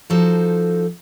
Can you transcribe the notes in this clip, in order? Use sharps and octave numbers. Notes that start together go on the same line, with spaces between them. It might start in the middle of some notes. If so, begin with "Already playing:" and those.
F3 D#4 F#4 A4 C5